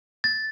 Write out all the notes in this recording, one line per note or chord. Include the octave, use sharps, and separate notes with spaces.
A6